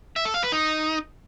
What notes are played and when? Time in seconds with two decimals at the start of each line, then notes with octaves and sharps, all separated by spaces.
0.16 E5
0.25 A4
0.34 F5
0.43 B4
0.52 D#4